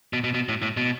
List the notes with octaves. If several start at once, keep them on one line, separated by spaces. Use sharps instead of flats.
B2
B2
B2
A2
A2
B2